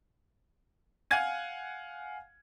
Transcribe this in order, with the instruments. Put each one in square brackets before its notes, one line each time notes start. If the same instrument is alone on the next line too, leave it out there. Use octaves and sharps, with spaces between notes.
[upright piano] F5 F#5 G#5 G#6 D#7